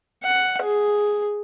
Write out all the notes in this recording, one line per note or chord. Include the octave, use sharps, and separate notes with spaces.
F#5
G#4